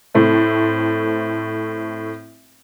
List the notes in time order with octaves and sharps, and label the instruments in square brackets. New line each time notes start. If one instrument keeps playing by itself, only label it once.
[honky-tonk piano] A2 A3 C4